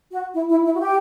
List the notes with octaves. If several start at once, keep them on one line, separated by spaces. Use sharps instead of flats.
F#4
E4
E4
E4
F#4
G4